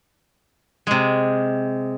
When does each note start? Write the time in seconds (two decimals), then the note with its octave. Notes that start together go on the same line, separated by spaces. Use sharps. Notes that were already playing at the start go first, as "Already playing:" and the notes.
0.87 C3 G#3